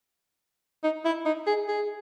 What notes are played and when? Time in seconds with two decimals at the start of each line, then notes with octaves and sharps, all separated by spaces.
0.84 D#4
1.05 E4
1.25 D#4
1.47 G#4
1.68 G#4